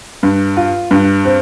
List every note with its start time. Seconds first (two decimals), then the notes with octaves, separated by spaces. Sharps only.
0.23 G2
0.57 F4
0.91 G2
1.25 C4